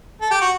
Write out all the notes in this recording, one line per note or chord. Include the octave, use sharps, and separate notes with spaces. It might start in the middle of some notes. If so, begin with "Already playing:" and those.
A4
G4
F#4